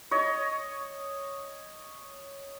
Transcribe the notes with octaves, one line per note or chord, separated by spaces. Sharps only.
C#5 D#5